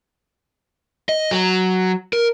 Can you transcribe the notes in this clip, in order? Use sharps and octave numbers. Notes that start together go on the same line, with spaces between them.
D#5
F#3
A#4